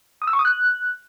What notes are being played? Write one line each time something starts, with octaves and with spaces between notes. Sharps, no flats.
D#6
E6
C#6
D#6
F#6